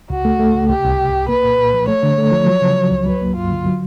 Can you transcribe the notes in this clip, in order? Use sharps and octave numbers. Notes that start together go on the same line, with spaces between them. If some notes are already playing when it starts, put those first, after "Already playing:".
C#2 F#4
A3
A3
C#2
C2 G4
C2
C2
C2
A#3 B4
A#2
A#2
F3
A3 C#5
D3
A3
F3
F#3
C#3
F#3
C#2
F#3 B4
A#3
G2 F4
D3
F#3